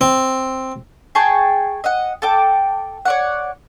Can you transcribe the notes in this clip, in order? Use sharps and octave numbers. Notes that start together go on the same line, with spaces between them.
C4
G#4 G5 A5 C#6
D#5 F#5
A4 G5 D6
C#5 D5 F#5